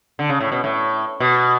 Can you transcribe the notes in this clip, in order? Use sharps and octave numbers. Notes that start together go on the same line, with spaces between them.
D3
C#3
A2
B2
A2
B2